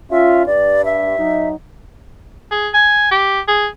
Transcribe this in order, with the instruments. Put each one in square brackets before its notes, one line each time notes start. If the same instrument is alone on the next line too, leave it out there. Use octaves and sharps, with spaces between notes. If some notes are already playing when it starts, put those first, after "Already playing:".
[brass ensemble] C#4 F4 [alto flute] E5
[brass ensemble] G2 [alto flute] D5
[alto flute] E5
[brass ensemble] F#3 D#4
[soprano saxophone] G#4
G#5
G4
G#4